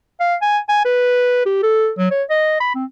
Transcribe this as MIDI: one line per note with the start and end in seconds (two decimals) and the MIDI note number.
0.20 0.35 77
0.42 0.58 80
0.68 0.83 80
0.85 1.43 71
1.45 1.60 67
1.63 1.90 69
1.98 2.08 54
2.11 2.23 73
2.30 2.56 75
2.60 2.74 83
2.75 2.84 60